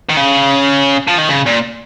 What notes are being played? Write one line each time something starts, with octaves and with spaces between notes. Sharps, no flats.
D#3
C#3
F3
D#3
C#3
A#2